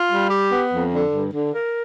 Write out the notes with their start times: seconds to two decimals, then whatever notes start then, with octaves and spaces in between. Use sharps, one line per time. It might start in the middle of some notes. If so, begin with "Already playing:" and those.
Already playing: F4
0.11 G3
0.31 G4
0.51 B3
0.72 F2
0.92 D3
1.12 G2
1.32 D3
1.53 A#4